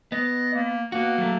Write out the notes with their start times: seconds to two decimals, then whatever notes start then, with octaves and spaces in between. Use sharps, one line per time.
0.12 B3 D#5
0.54 A#3
0.92 A#3 B3 F#4
1.18 F#3 A3